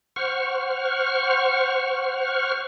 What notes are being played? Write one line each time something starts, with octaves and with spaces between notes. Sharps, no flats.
C5 F#5 C#6 F6